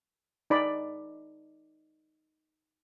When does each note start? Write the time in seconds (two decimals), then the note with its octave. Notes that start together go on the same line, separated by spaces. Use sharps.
0.50 D#4 D5 B5